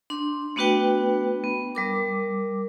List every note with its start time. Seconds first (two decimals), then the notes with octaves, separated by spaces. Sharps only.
0.10 D4 C6
0.56 A3 B3 D4 F#4 B4 G5
1.44 B3
1.75 G3 A#4 D6